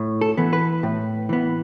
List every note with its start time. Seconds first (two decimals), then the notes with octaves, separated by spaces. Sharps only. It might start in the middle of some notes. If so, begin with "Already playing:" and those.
Already playing: A2
0.21 A4
0.37 E3 B3
0.53 B4
0.83 A2
1.29 E3 B3